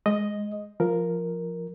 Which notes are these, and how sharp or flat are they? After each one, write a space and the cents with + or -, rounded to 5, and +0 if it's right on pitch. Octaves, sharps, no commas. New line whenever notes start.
G#3 +0 D#5 +0
F3 +0 A#4 +0